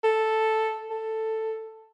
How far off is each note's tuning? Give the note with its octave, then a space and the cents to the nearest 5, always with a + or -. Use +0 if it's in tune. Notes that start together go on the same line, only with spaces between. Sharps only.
A4 +0
A4 +5